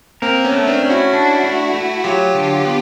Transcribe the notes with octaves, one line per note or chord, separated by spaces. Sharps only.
A#3 C4 A#4
B3 C#4
A3
C4 D4
C#4
E4 F#4
D4
A3
A3
F#3 F4 G4
D3
B3